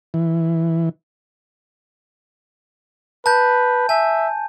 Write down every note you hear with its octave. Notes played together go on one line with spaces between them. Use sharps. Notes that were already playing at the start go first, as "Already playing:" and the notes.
E3
B4 A5 G6
E5 G#5